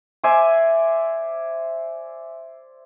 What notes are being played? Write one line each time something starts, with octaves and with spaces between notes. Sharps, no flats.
C5 D5 E5 G#5